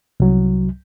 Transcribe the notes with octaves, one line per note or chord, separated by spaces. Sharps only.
C2 F#3